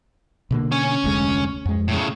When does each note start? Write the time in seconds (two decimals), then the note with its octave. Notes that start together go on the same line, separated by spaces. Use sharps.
0.51 B2 D3 A#3
0.72 C#4 G#5
1.04 F1 D2 G#3
1.66 F2 G#3
1.88 A2 C#3